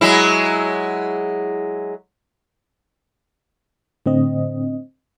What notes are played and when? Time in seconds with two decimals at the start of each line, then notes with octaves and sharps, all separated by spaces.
0.01 F#3 G#3 E4
4.06 A2 D3 C4 D#5